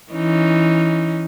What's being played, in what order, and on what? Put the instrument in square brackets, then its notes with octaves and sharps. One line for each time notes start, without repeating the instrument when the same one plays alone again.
[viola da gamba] E3 C#4 D#4